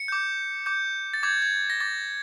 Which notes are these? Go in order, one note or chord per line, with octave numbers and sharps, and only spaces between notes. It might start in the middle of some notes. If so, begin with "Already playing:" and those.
Already playing: C#7
D6 G6
D6 G6
A6
D6 G6 G#6
G#6
A#6
D6 G6 A6